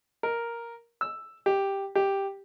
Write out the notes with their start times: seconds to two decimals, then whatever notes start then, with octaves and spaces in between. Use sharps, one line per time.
0.23 A#4
1.01 E6
1.46 G4
1.95 G4